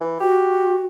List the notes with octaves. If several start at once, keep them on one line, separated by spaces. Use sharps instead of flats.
E3
F#4 G4